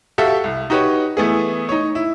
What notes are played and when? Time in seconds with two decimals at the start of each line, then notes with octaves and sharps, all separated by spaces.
0.18 F#4 G4 A4 E5 F5 G5
0.44 C2
0.70 D#4 F#4 G4 B4 C#5
1.17 E3 A3 B3 G#4
1.69 D#4 C#5
1.95 E4